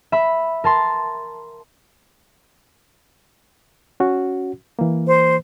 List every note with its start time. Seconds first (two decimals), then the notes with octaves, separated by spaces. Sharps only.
0.12 E5 B5
0.64 A#4 A5 C6
4.00 C#4 F#4
4.79 E3 A#3
5.07 C5